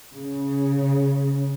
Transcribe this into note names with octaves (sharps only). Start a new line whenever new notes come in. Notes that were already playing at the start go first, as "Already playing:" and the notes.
C#3